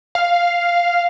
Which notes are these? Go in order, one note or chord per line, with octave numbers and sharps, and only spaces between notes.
F5